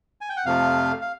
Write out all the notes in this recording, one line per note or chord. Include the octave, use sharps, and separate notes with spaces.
G#5
G5
F#5
F2 C3 F3 A3 F5
F5